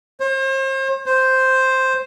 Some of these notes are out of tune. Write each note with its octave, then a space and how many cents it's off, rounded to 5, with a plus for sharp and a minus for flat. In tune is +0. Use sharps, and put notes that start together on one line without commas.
C5 +40
C5 +0